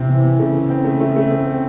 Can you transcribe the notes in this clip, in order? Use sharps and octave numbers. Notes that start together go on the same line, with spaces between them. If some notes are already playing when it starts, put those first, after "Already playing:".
Already playing: C3 C4 E4
E3
E3
C#3 A3
E3
C4
A3
A3
A3
C4
C4